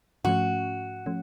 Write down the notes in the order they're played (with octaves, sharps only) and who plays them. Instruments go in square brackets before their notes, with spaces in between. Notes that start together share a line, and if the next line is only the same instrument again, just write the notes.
[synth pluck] G#2 F3 A3 C#4 [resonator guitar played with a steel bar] F#4
[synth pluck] F3 A3 C#4